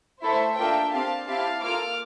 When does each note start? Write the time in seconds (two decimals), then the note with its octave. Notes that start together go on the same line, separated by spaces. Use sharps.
0.23 A3 E4 A4 C5 E5
0.58 A#3 D4 F4 A4 E5 G5
0.93 C4 G4 F5 A5
1.27 C4 E4 G4 F5 A5
1.63 A#3 F4 A4 D6 F6